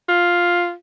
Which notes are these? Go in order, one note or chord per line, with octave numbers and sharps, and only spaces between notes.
F4